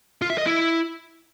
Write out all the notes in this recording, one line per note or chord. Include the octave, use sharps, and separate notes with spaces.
F4
E5
D#5
E4